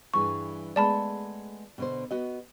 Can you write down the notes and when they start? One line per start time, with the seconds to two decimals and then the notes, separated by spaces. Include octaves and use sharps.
0.14 G2 E3 G#4 C#6
0.76 G#3 A3 B3 D5 A5 B5
1.78 B2 D3 C5
2.11 B3 F#4 D#5